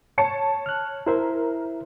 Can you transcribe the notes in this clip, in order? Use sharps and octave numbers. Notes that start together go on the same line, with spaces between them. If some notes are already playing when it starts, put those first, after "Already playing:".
C#5 A5 C#7
F6 F#6
E4 A#4 C5 E5